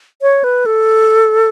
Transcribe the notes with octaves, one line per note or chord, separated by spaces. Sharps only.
C#5
B4
A4